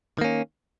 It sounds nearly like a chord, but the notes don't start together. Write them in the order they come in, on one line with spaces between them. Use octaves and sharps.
D#3 A#3 C#4